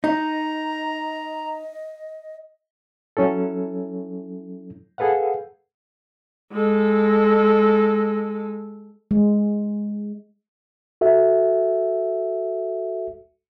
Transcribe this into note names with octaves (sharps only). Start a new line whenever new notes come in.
D#4 D#5 A#5
F#3 C#4 E4 A4
G#4 A4 B4 F5 F#5
G#3 A4
G#3
F#4 A4 E5